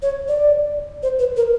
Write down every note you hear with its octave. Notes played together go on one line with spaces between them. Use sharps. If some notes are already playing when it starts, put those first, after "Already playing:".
C#5
D5
C5
B4
A#4